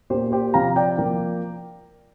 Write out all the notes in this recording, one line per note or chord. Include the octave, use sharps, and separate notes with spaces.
A#2 A#3 G4 C5
G4 C5
C3 F3 C4 F5 A#5
D5 G5
F3 A#3